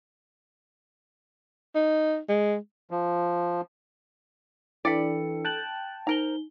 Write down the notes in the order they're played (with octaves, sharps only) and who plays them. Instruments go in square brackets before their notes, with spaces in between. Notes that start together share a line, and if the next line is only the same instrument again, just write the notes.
[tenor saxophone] D#4
G#3
[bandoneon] F3
[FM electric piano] E3 D4 [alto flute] A4 [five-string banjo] D5 B5 [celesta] G5 C#7
[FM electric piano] G5 A5 [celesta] F#6 F#7
[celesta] D#4 G7 [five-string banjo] A#4 A#5 [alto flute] C5